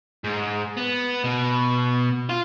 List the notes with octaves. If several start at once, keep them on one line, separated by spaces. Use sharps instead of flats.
G#2
B3
B2
F4